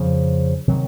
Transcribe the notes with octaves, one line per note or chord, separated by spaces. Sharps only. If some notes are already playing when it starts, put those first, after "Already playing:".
Already playing: F2 C#3 F3
C3 D#3 F#3